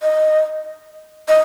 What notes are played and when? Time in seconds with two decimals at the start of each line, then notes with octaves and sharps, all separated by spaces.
0.03 D#5
1.28 D#5